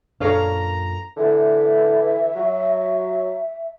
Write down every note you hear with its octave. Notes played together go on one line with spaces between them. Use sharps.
F#2 A#2 D4 A4 B4 C#5 F5 A#5
D3 E3 E5
F#3